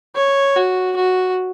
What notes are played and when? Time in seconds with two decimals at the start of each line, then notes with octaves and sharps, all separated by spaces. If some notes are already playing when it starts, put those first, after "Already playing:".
0.16 C#5
0.56 F#4
0.96 F#4